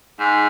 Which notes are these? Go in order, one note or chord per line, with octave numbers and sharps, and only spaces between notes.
G#2